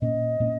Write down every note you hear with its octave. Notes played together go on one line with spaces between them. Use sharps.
A#2 A#3 C#4 D#5
A#2 A#3 C#4